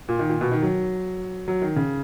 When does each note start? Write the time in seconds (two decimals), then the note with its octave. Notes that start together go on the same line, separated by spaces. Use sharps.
0.08 A#2
0.19 D#3
0.29 A#2
0.41 B2
0.52 D#3
0.62 F#3
1.48 F#3
1.62 D#3
1.76 C#3